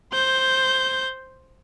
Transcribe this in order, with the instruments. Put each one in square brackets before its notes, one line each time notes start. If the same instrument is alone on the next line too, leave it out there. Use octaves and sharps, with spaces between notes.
[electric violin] C5 G6